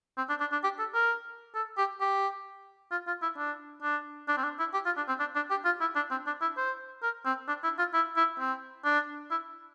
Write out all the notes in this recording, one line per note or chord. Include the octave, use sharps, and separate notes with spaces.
C4
D4
D4
D4
G4
A4
A#4
A4
G4
G4
F4
F4
E4
D4
D4
D4
C4
D4
E4
G4
F4
D4
C4
D4
D4
G4
F4
E4
D4
C4
D4
E4
C5
A#4
C4
D4
E4
F4
E4
E4
C4
D4
E4